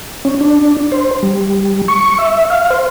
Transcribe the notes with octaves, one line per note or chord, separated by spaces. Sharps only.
C#4
D4
C5
G3
C#6
E5
F5
C5